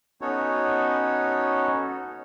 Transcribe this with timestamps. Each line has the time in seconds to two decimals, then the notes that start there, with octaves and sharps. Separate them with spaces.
0.21 B3 C#4 D#4 F#4 A4 C#5